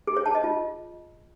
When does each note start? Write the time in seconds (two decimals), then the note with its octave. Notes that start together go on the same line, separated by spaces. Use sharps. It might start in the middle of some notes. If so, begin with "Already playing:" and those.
0.07 G#4
0.17 C#5
0.26 A5
0.35 D#5
0.44 F4